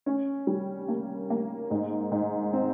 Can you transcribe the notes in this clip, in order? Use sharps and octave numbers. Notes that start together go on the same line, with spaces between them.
C#4
G3
A#3
A#3
G#2
G#2
C4